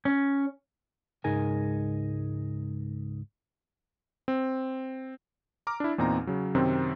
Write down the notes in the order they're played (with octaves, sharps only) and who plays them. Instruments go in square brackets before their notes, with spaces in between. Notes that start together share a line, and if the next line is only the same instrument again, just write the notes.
[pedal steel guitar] C#4
[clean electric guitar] C#2 G#2 D#4 G#4 A#4 G#5
[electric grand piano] C4
A#5 D6 F6
D4 E4
E2 A#2 C4 D#4 A#5
C#3 F#3
F#2 C3 D#3 C4